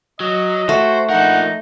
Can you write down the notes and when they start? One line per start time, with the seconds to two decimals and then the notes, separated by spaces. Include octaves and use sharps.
0.20 F#3 D#5
0.69 A3 F#4 C5
1.09 F3 D#4 A#4 F#5